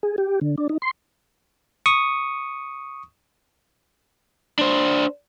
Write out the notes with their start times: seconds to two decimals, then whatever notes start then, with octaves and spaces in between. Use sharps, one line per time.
0.03 G#4
0.18 G4
0.41 D3
0.58 D4
0.69 D#4
0.82 C6
1.86 C#6 D#6
4.59 D4 C5